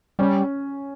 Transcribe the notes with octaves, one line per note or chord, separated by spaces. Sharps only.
G3 C#4